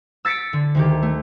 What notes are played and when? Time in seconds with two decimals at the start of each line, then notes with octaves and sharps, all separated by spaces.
0.25 E6 A6 B6 C#7 D7
0.53 D3
0.75 D2 D#3 G4
1.03 A3